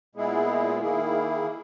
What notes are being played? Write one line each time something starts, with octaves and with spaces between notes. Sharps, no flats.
A#2 G#3 B3 E4 G#4
D#3 A#3 E4 G#4